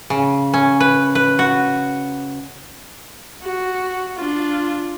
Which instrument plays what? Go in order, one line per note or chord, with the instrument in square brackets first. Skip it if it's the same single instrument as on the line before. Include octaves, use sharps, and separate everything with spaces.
[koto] C#3
C#4
B4
B4
F#4
[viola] F#4
D4 F4